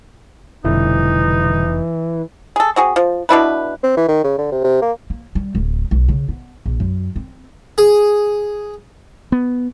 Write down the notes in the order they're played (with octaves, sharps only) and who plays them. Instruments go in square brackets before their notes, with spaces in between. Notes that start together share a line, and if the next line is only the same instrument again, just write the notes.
[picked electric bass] F1 [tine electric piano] B2 D3 G3 [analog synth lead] E3 [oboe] D#4
[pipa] G#4 A4
C4 F#4 G#4
F3
B2 D4 E4 B4
[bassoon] C4
E3
D#3
C#3
D3
C3
C3
A#3
[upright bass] A#3
G3
D1
B1
C#3
B3
A#1
F#2
C4
[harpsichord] G#4
[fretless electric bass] B3